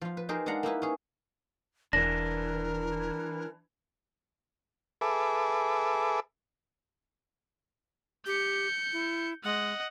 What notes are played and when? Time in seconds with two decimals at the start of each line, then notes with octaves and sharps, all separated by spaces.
0.01 F3 F4
0.17 B4
0.29 D#4 G4 G#4 A#4 C5
0.46 G#3 D4 F5 F#5 A#5
0.63 A#3 D#4 E4 B4
0.82 C#4 G#4
1.93 E1 E3 D4 A#4 A#6
5.01 G#4 A4 B4 E5 D6
8.26 G4 G6 C#7
8.93 E4
9.44 G#3 D#5 F#5